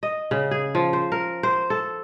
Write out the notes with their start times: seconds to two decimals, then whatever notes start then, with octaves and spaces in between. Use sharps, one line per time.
0.03 D#5
0.31 C#3
0.51 G#4
0.75 F3
0.93 C5
1.12 A#4
1.43 C5
1.70 A4